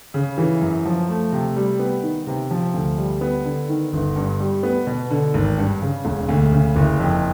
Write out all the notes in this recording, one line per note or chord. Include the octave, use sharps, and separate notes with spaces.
C#3
E3
F#2
F3
A3
C3
G3
B3
D#3
C3
F3
D2
G3
B3
D3
D#3
G1
G2
G3
B3
B2
D3
G#1
G2
C#3
E1
D2
C#3
F#1
F2